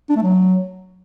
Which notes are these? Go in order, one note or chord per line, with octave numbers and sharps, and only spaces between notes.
D4
A3
F#3